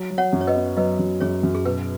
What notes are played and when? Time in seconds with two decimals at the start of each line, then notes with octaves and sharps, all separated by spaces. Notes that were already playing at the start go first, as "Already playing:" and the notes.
Already playing: F#3
0.11 F#3
0.18 C#5 F#5
0.33 F#2
0.41 C#5
0.47 B4 D#5
0.55 B3
0.77 F#3 B4 D#5
0.99 F#2
1.21 F#2 G#4 C#5
1.43 F#2
1.55 G#4
1.65 B2 B4